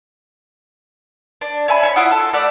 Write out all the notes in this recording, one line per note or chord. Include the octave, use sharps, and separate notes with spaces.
D4
C#5 E5 G#5 B5
C#5 E5 G#5 B5
E4 F4 F#5 D#6
A4
A3 D5 F#5 B5